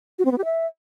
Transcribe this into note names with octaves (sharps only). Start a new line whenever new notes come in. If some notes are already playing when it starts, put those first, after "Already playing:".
F#4
C4
B3
G4
E5